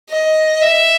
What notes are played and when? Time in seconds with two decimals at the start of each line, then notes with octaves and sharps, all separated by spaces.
0.10 D#5
0.62 E5